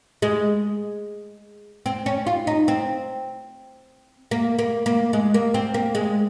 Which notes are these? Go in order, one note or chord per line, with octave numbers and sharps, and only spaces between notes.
G#3
C4
C#4
F4
D#4
C4
A#3
A#3
A#3
G#3
A#3
C4
A#3
G#3